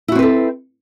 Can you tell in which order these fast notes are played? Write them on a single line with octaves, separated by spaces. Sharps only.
E4 F#4 C4 B4 A4